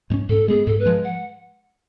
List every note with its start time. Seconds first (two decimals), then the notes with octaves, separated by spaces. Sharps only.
0.10 G#2 G#3 C#4
0.29 G#2 A4
0.48 G#3 B3 G#4
0.66 G#2 A4
0.79 B4
0.86 F3 G#3
1.04 F#5